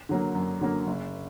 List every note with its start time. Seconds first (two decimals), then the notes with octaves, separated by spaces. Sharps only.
0.09 D3 F#3 A#3
0.35 F#2
0.61 D3 F#3 A#3
0.87 F#1